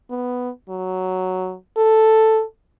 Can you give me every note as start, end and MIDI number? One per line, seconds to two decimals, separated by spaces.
0.10 0.50 59
0.69 1.54 54
1.77 2.43 69